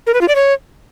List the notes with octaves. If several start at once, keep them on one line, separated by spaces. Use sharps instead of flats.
A#4
B4
F4
D5
C#5